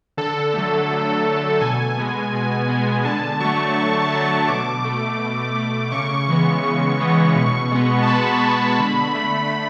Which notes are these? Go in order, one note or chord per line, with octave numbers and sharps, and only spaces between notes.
D3 A4
F#3 A3
D3
F#3 A3
B2 G#5
G#3 B3
B2
G#3 B3
D3 A5
F#3 A3 C#6
D3 C#6
A5
F#3 A3
C#6
B2 D6
A3
B2
A3
C#3 C#6
E3 G#3 B3
C#3
E3 G#3 B3
B2
G#3 B3
A5
B2 B5
G#3 B3
D3
A3
D3